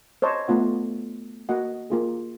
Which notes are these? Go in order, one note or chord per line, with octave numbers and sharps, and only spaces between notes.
C5 C#5 D#5 A5 B5
A3 B3 F4 F#5
A#3 F#4 D#5 F#5
A#3 F4 G#4